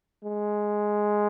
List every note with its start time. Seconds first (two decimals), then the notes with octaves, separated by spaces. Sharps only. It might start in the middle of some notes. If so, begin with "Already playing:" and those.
0.24 G#3